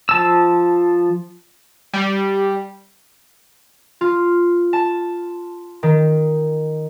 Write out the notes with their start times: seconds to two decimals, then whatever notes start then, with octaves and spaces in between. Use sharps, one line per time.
0.09 F3 A5 E6
1.94 G3
4.01 F4
4.73 A5
5.83 D#3